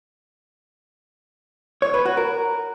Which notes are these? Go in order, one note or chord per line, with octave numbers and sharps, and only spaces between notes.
C#5
B4
F#4
A#4